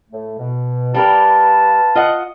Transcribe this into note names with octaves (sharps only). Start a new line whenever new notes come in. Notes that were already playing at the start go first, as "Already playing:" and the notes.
A2 A3
B2
G3 G4 A#4 B4 F5 A5
F4 D#5 F#5